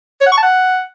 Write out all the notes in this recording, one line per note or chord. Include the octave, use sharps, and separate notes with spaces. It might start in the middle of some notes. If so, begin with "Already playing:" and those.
C#5
F#5
C#6
A5
F#5